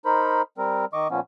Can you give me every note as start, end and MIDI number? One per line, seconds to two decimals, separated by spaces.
0.05 0.42 63
0.05 0.42 70
0.05 0.42 72
0.05 0.42 83
0.58 0.85 55
0.58 0.85 60
0.58 0.85 70
0.93 1.08 51
0.93 1.08 75
0.93 1.08 85
0.93 1.08 86
1.11 1.20 46
1.11 1.20 53
1.11 1.20 59
1.11 1.20 61